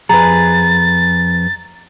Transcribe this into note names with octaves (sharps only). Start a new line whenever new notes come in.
F2 G#4 B4 A#5 A6